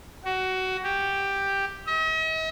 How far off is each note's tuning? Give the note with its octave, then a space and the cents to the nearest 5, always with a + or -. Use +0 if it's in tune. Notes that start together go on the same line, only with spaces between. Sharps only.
F#4 +20
G4 +5
D#5 +45